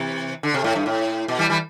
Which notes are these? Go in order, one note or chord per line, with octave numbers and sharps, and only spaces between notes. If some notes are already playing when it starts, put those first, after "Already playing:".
Already playing: C3 E3
D3
C3
A2
G2
A2
B2
E3 G3
E3 G3